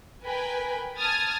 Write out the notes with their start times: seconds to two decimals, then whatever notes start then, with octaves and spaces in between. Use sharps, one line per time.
0.25 A#4 B4 G5 G#5 B5
0.97 A5 D#6 F6 G#6 A6